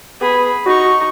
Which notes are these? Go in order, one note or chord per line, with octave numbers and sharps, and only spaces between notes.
B3 G#4 B5
D#4 F#4 C#6